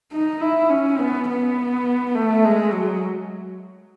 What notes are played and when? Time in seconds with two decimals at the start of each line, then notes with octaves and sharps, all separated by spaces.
0.13 D#4
0.41 E4
0.70 C#4
0.99 B3
1.29 B3
2.15 A3
2.45 G#3
2.73 F#3